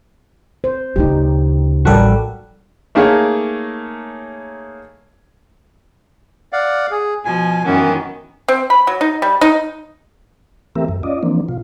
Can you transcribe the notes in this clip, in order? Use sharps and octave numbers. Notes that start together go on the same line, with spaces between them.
C5
D2 C#3 D#4 G4
A1 G3 F#4 A4 A#4
A3 A#3 D#4 G#4 A#4 C#5
D5 F5 F#5
G#4
B2 F3 G#5
F#2 D#3 E3 B3 C#4
C4
B5
F#3
D#4
G3
D#4
E3 A3 C4 G4 A#4 E5
F#2
C#4 F4 D5 D#5
E3 F3 A#3 C4 D4
B2 F4